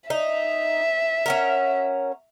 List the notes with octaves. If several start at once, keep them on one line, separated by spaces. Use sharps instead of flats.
D#4 E5
C#4 F#4 A#4